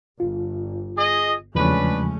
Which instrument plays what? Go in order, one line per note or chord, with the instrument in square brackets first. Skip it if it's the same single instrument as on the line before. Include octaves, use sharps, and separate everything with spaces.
[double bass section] G1 [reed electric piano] F4
[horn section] G#4 D#5
[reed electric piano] E2 C#3 F3 [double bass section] G#3 A3 C#4 [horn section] D4 B4